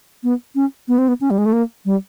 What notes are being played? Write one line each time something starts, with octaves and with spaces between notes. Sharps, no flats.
B3
C#4
B3
C4
B3
C#4
G3
G#3
A3
A#3
G3